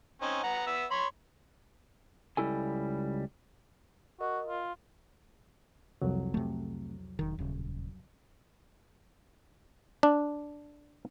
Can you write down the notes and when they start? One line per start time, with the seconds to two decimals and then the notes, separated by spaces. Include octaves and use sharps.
0.22 C4 C#4 D#4
0.43 B3 F#5 A#5
0.67 B3 E5
0.91 C#5 B5 C6
2.37 C#2 G3 E4 A4 G#5
4.21 F#4 A#4 D#5
4.47 F4
6.02 C2 F2 F#3
6.34 C3 A3
7.19 E1 D#3
7.39 D#1 C#3
10.03 D4